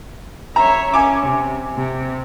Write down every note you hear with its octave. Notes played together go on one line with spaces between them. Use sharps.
C#5 E5 A#5
C#4 G#5 D6
C3
C3